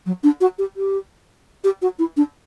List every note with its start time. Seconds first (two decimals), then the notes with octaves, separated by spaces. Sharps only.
0.06 F#3
0.23 D4
0.40 F#4
0.58 G4
0.76 G4
1.64 G4
1.81 F#4
1.99 E4
2.16 D4